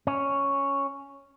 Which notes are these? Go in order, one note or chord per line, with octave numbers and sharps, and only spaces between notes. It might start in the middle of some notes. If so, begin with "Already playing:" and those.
C#4